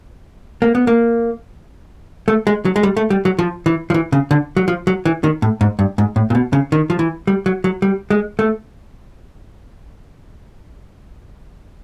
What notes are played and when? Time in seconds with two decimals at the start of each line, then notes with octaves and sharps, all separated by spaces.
0.62 A#3
0.75 B3
0.87 A#3
2.28 A3
2.47 G#3
2.65 F#3
2.76 G#3
2.83 G3
2.97 A3
3.10 G3
3.25 F#3
3.39 F3
3.66 E3
3.90 F3
3.94 E3
4.12 C#3
4.31 D3
4.57 F#3
4.68 F3
4.87 F#3
5.05 E3
5.24 D#3
5.42 A2
5.61 G#2
5.79 G2
5.98 G#2
6.16 A2
6.30 A#2
6.35 B2
6.53 C#3
6.72 D#3
6.90 F3
6.99 E3
7.27 G3
7.46 F#3
7.64 F#3
7.82 G3
8.10 G#3
8.39 A3